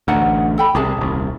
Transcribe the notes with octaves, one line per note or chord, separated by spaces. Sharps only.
A1 D2 D#4 F#5
A4 G5 B5
C2 C3 E4 G#4 A5
D#1 C2